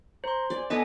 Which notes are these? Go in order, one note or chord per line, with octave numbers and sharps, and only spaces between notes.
C5 A#5 C6
G#4 D5
B3 A4 B4 D#5 G#5